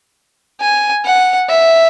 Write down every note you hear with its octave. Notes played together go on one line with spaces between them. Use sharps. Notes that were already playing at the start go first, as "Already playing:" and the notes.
G#5
F#5
E5